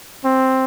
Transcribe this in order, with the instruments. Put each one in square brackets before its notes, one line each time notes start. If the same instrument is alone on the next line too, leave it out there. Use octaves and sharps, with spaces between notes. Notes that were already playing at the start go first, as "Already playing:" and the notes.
[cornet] C4